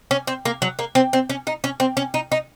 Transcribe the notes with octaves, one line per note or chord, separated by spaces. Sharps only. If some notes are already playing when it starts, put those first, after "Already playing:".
C#4
C4
A#3
F#3
A#3
C4
C4
C#4
D#4
C#4
C4
C#4
D#4
D#4